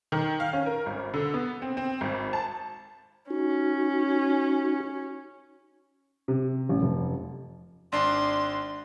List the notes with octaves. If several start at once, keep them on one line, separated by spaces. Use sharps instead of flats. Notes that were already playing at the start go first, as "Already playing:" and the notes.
D#3
F5
C#4
A#4
G#1
D3
B3
C4
C4
G#1
A5
C#4 D#4 F#4
C3
A1
F1
G#1 D4 C6